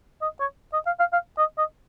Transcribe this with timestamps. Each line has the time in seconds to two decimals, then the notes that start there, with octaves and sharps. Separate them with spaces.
0.22 D#5
0.40 C#5
0.73 D#5
0.86 F5
1.00 F5
1.13 F5
1.38 D#5
1.58 D#5